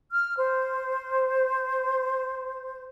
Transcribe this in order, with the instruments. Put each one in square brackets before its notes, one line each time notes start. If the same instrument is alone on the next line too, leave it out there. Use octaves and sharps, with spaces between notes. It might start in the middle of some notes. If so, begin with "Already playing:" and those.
[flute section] F6
C5